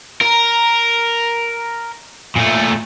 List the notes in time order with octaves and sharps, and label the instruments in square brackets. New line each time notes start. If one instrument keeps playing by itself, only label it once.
[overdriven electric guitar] A#4
A#2 A3